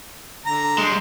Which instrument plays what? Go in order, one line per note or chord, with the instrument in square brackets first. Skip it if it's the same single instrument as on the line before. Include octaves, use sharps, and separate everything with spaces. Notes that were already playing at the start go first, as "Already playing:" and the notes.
[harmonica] D3 A#5
[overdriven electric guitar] G3 G#3